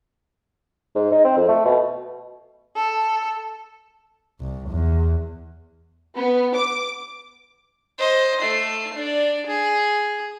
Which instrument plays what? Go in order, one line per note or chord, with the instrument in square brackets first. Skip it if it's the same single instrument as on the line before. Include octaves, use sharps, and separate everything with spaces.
[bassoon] G#2
D#4
C4
F2
A3
B2
[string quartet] A4
[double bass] C2
E2
[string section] B3
D6
[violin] C5 D#5
A3 C7
D4 D5
G#4